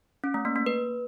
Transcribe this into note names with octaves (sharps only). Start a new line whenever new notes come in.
C#4
A3
A#3
A#3
B4